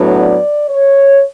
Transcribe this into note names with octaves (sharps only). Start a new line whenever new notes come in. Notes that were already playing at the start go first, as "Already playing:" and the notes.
Already playing: A2 F#3 B3 D4
D5
C#5